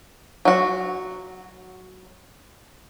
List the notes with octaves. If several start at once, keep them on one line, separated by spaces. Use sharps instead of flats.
F#3 F#4